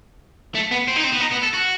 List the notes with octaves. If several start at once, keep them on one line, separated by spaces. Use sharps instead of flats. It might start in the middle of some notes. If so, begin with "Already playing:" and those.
A3
B3
C4
D#4
C4
B3
D#4
B3
A4
F#4